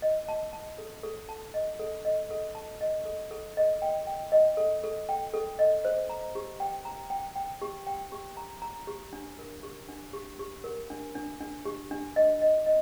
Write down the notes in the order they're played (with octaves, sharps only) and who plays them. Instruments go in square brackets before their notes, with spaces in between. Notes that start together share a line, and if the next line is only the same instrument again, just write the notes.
[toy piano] D#5
A5
A5
A4
A4
A5
D#5
A4
D#5
A4
A5
D#5
A4
A4
D#5
G5
G5
D#5
A4
A4
G5
A4
D#5
C5
A#5
G4
G5
A#5
G5
G5
G4
G5
G4
A#5
A#5
G4
D4
A#4
G4
D4
G4
G4
A#4
D4
D4
D4
G4
D4
D#5
D#5
D#5